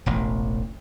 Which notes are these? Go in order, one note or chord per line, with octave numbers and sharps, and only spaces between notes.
E1 A1